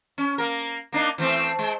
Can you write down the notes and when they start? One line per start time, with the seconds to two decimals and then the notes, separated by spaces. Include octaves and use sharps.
0.18 C#4
0.38 A#3 A#4
0.92 A#3 D4 D#4
1.18 E3 A3 C4
1.59 G#3